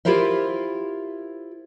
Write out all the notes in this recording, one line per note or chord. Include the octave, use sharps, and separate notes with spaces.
E4 F4 G4 A#4 C5 E5